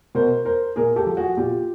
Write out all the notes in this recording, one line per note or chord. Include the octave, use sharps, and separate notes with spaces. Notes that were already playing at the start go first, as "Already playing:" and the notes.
B2 A#4 C5
A#4 C5
A#2 G#4 A#4
G4 A4
F3
F#4 G#4
A#2 F4 G4